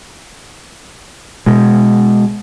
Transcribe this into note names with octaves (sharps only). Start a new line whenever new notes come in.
B2 G#3